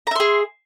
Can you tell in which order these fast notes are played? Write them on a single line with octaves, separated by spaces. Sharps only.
A#5 E5 C6 G#4